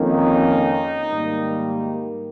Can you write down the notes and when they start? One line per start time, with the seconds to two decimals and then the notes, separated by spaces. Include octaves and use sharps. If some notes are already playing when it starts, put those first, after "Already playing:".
Already playing: F2 D#3 A#3 C#4
0.09 D#4
1.10 G#2 D#3 G3 A#3